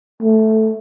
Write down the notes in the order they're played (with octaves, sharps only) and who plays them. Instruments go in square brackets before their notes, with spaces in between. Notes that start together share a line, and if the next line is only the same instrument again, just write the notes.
[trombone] A3